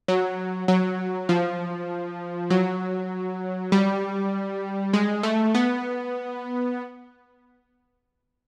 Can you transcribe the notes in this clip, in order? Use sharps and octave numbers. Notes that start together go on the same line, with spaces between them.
F#3
F#3
F3
F#3
G3
G#3
A3
B3